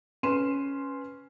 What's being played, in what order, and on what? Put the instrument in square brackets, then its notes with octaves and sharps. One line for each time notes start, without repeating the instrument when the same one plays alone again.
[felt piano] C#4 B4 C6 D#7 E7